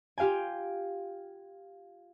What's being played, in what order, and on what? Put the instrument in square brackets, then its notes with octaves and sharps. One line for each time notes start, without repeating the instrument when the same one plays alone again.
[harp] F4 G4 F5 G5 G#5